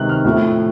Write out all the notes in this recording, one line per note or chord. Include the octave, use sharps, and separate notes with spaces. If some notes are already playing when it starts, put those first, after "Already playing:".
Already playing: C3 D#3 G#3 F#6
F6
A2 F3 A3